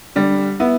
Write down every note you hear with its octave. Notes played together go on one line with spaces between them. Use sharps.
D3 G3
B3 E4